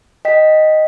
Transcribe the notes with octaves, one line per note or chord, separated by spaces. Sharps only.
D#5 G5 B6